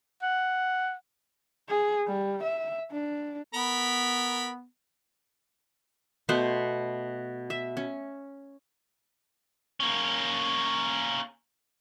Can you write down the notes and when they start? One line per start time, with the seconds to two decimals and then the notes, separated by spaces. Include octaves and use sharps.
0.23 F#5
1.69 G#4
2.07 G3
2.43 E5
2.92 D4
3.54 B3 A#4 B5
6.29 B2 A3 B3 C5
7.50 E5
7.77 C#4
9.80 A#3 C#4